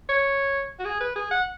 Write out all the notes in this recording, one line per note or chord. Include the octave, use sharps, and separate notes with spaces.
C#5
F#4
G#4
B4
G#4
F#5